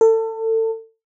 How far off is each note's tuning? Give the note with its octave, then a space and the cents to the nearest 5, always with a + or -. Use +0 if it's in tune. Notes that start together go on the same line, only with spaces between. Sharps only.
A4 +30